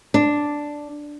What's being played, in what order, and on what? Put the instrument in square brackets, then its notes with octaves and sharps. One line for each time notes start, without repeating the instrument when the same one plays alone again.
[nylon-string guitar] D4